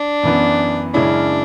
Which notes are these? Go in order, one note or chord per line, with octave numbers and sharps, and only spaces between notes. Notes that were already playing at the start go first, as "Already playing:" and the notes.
Already playing: D4
F#2 E3 B3
F#2 C#3 G#3 C#4 D4 E4